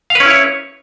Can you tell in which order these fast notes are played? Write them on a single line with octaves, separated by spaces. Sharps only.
F5 B4 C#4 E4 C#5